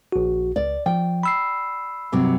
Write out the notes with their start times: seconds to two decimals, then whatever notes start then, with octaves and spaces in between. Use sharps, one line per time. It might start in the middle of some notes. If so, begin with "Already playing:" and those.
0.12 A#1 F#4
0.56 C#2 D5
0.86 F3 G5
1.23 B5 E6 C7
2.12 G2 C3 F#3